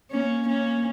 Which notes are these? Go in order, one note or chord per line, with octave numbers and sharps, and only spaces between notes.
A#3 C#4
A#3 C#4